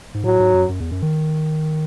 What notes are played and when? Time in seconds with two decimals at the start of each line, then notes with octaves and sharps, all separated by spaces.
0.14 G#2
0.23 A2 F#3
0.39 G#2
0.54 F#2
0.69 F#2
0.80 E2
0.91 F#2
1.02 D#3